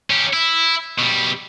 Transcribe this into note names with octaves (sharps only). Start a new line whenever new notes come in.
C#4 G4
E4
B2 G3